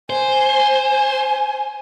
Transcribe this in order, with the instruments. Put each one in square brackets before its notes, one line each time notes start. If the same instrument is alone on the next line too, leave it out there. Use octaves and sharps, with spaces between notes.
[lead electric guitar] C5 [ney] G#5